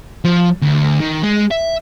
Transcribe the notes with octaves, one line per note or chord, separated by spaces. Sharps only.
F3
D2
D#3
G#3
E5